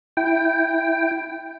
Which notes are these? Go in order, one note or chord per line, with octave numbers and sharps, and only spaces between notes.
E4 G5